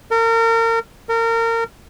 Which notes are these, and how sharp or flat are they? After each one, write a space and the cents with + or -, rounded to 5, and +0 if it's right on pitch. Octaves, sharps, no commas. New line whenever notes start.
A#4 -35
A#4 -30